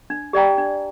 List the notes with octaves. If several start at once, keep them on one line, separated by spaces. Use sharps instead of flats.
D4
G4 D5 G5 A#5
D4